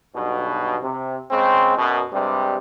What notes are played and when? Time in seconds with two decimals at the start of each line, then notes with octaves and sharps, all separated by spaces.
0.15 B1 G2 B2
0.83 C3
1.31 C#3 G#3 C4
1.78 F#2 B2
2.12 G2 C3 G3 G#3